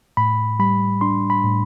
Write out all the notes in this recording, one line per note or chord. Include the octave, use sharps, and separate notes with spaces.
A2 B5
G3 B5
D4 C6
B5
A2